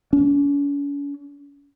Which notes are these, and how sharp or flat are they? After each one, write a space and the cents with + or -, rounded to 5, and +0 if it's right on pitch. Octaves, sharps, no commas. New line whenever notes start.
C#4 +45